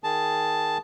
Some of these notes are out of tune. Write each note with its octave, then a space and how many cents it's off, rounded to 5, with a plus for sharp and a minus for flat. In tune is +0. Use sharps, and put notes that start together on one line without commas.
D#3 +0 G#4 +0 A5 +0